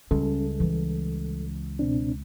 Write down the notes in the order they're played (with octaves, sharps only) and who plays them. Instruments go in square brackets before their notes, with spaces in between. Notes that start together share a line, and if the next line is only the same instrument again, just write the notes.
[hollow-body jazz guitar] C#2 [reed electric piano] G3 A4 [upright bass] C#4
[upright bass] E3
[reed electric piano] B2 C4 D4